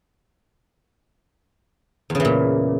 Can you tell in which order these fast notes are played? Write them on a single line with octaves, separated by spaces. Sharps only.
E2 C#3 E3 A#2